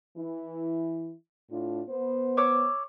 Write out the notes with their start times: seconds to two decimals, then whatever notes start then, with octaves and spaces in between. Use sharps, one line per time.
0.17 E3 E4
1.51 A2 D4 F4
1.89 B3 C5
2.37 C#5 D6 E6